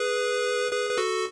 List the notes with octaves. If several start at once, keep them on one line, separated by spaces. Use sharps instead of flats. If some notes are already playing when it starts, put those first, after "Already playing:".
Already playing: G#4 B4
G#4 B4
B4
F#4 A4